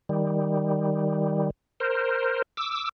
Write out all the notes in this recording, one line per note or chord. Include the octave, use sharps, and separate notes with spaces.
D#3 G3
A#4 C5
D6 E6